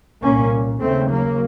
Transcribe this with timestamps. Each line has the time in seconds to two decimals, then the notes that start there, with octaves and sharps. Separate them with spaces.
0.23 C2 A#2 A#3 C#4
0.81 D#2 C#3 A3 C4
1.10 F#3 A#3